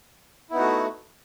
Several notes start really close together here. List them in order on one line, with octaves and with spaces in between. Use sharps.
E4 B3 D#4 F#4 A3